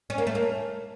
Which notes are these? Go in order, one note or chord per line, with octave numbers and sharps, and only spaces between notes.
C#4
A#3
A3
A#3